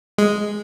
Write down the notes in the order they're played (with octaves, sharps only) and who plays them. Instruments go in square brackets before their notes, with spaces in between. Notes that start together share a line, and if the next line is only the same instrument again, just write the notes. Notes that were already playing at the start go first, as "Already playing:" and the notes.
[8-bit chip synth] G#3